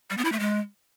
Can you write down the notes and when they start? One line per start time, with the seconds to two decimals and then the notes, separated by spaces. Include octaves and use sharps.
0.10 G3
0.17 B3
0.25 E4
0.32 A3
0.40 G#3